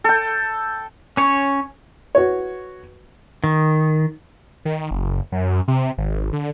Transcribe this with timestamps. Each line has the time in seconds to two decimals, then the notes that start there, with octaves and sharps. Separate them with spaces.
0.04 A4 G5
1.17 C#4 C#5
2.15 F#4 B4 C#5
3.44 D#3
4.65 D#3
4.91 F#1
5.32 F#2
5.68 C3
5.98 G#1
6.33 D3